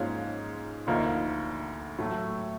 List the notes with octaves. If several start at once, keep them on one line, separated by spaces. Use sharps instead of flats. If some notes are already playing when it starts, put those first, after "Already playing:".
Already playing: G#2 F3 A#3 C#4 F4
D2 D3 F3 A#3 D#4
A2 F#3 A3